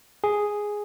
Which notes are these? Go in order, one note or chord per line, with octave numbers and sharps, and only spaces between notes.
G#4